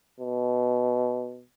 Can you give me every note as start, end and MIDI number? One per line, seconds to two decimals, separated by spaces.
0.20 1.43 47